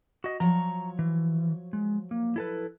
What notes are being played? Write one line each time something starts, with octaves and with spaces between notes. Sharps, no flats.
F#4 D#5
F3 F#3 C#5 A#5
E3
G#3
A#3
E4 A4 B4